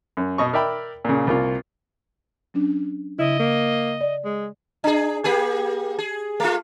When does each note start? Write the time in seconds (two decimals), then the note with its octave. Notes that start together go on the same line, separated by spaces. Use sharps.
0.17 F#2
0.38 B2 D#5 C#6
0.53 A#4 D5 E5 G5 B5
1.05 A#2 C#3
1.27 C2 A#3 F4
2.54 F#3 C#4 D4
3.19 C#3 E4 D#5
3.39 A#3
4.01 D5
4.25 G#3
4.84 D4 G#4
5.24 A#3 G4 G#4
5.99 G#4
6.40 A3 F4